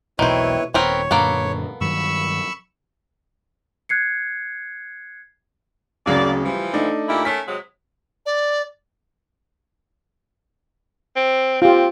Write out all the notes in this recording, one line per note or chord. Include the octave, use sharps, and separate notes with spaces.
E1 B1 B2 D#3 C4 E4 B4 C#5
D#1 B3 C4 A#4 C#5
F#2 A#2 D3 A#3 B3 A4
G2 D#3 F#3 B5 C#6 E6
F#6 G#6 C7 C#7
D1 C#3 F#3 A#3 D5
E3 F3 G3
A3 D4 D#4
A#2 E4 G4
A3 C#4 A#4 B6
C3 F#3 G#3
D5
C4
C4 F4 G4